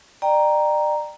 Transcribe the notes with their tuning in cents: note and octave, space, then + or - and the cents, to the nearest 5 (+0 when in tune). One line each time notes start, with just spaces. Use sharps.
D5 +35 G5 +0 A#5 +0